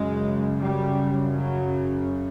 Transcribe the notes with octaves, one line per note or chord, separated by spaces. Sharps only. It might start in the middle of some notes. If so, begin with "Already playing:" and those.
Already playing: F#2 C#3 G#3
G3
F#3